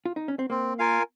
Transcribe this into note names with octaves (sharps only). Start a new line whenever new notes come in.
F4
D#4
C#4
C4
A#3 C4
F4 A#4 F5 G#5